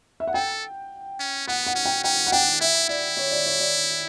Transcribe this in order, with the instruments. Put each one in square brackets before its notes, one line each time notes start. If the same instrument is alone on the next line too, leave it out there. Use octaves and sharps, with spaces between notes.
[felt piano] E5
F#5
[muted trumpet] A4 [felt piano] G5
[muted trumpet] C#4
[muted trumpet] B3 [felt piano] F#5
[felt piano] F#5
[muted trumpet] C#4
[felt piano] G5
[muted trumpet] C#4 [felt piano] G5
[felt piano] F#5
[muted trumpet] D4 [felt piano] G5
[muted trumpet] E4 [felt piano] E5
[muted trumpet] E4 [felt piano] D5
[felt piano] C#5
D5
C#5
D5